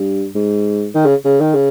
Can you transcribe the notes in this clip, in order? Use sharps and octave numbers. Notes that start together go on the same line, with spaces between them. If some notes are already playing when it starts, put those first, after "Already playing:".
Already playing: G2
G#2
D#3
C#3
C#3
D#3
C#3